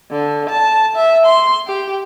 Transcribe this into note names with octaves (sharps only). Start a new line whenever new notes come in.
D3
A5
E5
C6
G4